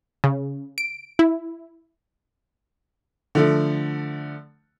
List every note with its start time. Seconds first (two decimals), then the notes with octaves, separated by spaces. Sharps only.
0.24 C#3
0.78 D7
1.19 E4
3.35 D3 F3 A3